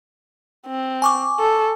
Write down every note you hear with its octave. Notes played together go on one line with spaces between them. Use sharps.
C4
G#5 C#6 D6
A4